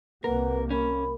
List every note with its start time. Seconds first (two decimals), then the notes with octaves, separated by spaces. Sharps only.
0.24 C2 C3 A#3 A#4 B4 F#5
0.71 C#4 A#4 B5